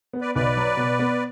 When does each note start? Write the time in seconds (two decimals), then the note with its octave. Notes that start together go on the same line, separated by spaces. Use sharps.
0.13 B3
0.21 B4 D5
0.35 B1 B4 D5
0.57 F#3
0.77 B2
0.99 B3